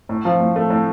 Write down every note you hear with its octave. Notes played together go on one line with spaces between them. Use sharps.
A2
F3
A2
A3
A2